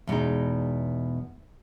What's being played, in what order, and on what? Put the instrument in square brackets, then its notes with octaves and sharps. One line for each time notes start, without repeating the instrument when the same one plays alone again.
[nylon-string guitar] E2 B2 G#3 D#4